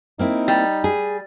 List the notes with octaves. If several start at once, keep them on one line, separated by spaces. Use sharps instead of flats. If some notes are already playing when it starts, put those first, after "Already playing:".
A#3 C4 D#4 E4
G3
G#4